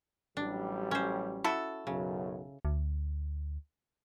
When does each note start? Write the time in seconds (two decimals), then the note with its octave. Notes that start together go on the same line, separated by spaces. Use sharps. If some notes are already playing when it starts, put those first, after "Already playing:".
0.37 A1 F#3 G3 D4
0.91 C#4 C5
1.44 E4 F#4 A4
1.87 B1 F#2 C#3 F#3
2.65 D2